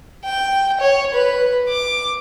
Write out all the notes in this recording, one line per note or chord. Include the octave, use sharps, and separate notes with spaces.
G5
C#5
B4
D6